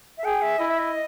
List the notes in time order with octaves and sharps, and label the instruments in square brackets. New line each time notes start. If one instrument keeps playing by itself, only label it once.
[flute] E5
[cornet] G#4 [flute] G5
[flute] E5
[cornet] E4 [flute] D#5
[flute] E5
D#5